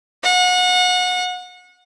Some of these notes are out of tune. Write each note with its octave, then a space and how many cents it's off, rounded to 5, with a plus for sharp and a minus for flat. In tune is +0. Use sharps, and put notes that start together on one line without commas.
F#5 -30